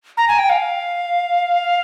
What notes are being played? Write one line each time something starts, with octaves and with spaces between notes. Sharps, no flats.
A#5
G#5
G5
F5